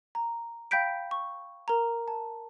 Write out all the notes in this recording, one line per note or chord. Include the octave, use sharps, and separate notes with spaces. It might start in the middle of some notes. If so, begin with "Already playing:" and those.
A#5
F5 G5 B5 G6 B6 D7
C#6
A#4 A#5
A5